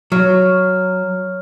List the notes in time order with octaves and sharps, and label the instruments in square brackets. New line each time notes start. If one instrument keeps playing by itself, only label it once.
[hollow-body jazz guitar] F#3 [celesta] C#5 F6